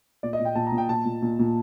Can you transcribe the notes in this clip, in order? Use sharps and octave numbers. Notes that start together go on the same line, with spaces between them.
A#2 D5
D#5
A#2
G5
A#2 A5
A#5
A#2
G5
A#2 A5
A#2
A#2
A#2